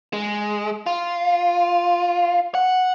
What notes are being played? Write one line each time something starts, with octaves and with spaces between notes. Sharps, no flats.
G#3
F4
F#5